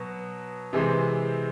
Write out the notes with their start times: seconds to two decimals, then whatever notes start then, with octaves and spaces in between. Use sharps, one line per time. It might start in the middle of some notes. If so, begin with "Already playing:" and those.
Already playing: B2 F#3 B3
0.73 C3 E3 G#3 C4